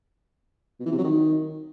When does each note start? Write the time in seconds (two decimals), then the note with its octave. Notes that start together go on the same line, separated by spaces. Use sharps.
0.80 B2
0.86 E3
0.92 C3
0.98 F#3
1.04 D#3